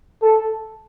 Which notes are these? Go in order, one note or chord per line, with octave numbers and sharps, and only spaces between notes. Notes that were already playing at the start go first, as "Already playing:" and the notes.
A4